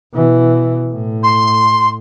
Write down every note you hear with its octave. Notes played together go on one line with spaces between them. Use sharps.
B2 E3
A2
C6